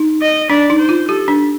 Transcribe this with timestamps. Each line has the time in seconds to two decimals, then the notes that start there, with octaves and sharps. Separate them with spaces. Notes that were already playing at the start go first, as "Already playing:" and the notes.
Already playing: D#4
0.22 D#5
0.50 D4 D5
0.70 D#4
0.79 C5
0.89 F4
1.08 G4 A4
1.28 D4